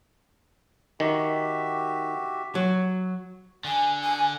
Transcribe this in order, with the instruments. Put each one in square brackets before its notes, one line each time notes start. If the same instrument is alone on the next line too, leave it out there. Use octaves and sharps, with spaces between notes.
[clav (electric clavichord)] D#3 [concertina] F#4 G4 E5
[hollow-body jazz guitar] F#3
[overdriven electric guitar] D3 [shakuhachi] G#5
[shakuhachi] G#5